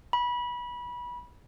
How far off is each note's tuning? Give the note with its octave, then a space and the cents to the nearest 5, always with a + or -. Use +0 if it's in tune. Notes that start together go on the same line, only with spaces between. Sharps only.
B5 -25